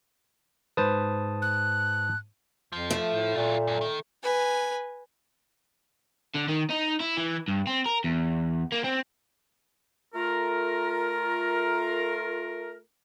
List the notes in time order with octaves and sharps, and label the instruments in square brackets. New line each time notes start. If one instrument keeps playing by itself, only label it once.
[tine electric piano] G#2 A5 D#6 [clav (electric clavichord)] B4 C5
[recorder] F#6
[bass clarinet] F2 [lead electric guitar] F3
[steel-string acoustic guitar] A3
[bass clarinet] A2
[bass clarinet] A#2 [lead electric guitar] F#3 F4
[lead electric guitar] F#2
D#3
[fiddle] B4 G#5
[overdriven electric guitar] D3
D#3
D#4
E4
E3
G2
C4
A#4
E2
A#3
C4
[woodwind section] A3 F4 A#4